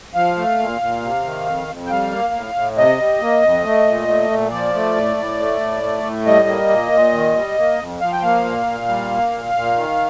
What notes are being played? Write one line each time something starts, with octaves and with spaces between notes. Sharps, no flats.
F3 F5
A3
A#2
A#2
C3
D#3
F2
F2
G5
G3 F5
A#3
A2
A2
C3 D#5
G3
A#3
F2
A3
A#2
A3
A#2
F3 D5
A3
A2
A2
A3
A2
A3
A2
G3 D#5
A#3
A#2
A#2
D#3
G3
A#3
F2
F3 F5
G5
A#3 F5
A#2
A#2
G3
A#3
A#2
A#2
D#3